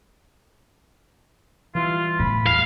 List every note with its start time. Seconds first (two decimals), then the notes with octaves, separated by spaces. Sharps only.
1.75 E3 F3 G3 F4
2.20 A2 B5
2.46 E2 G3 F5